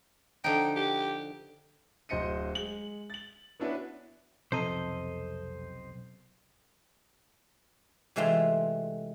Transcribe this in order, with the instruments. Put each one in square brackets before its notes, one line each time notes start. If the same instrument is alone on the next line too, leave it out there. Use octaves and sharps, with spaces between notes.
[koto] D3 F3 D#4 [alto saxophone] G5
[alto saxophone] G4
[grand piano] D1 C5 D#5 C#7 D#7
G#3 F#7
A6 F#7
B3 C#4 D4 E4 F#4 B4
[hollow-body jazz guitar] B1 C3 A#5 [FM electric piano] F2 A4 [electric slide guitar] C5 D#5
[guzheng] C3 E3 G#3 A3 C4 F4